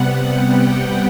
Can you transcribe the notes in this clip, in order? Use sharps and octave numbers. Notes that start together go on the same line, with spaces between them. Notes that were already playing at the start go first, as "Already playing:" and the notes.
Already playing: C3 G3 B3 F#5
G5